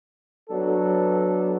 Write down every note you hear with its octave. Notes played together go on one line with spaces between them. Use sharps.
F#3 B3 D4 A4